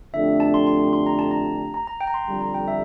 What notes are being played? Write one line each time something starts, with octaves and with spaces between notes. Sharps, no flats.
F2 D3 A3 D4 G4 E5
A5
C6
C6
C6
A#5
A5
A#5
A#5
A#5
G5
A#5
C6
F2 D3 G3
A#5
G5
E5